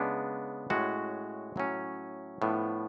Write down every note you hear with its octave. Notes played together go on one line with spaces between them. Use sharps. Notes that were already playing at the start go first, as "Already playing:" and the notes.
Already playing: C#3 G#3 B3 D4
A2 G#3 C#4 F#4
A2 F#3 C#4
A2 F3 B3 D4